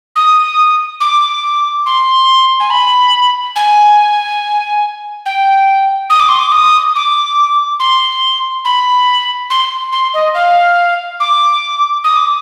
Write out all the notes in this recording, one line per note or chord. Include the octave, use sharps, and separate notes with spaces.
D#6
D6
C6
G#5
B5
G#5
G5
D#6
D6
C6
D6
D#6
D6
C6
B5
C6
C6
D#5
F5
D6
D#6
D6